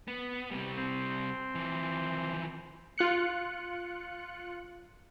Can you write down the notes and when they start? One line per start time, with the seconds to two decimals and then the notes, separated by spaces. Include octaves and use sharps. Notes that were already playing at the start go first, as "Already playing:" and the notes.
0.08 B3
0.51 C3 G3
0.77 C4
1.55 E3 F3
2.98 F4 F#6 C#7